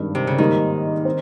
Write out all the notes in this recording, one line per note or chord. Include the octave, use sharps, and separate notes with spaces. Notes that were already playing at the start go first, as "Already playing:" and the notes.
Already playing: G#1 G2 D#3
C3
C#3
G#2 D#3 G3 A#3 D#4
C4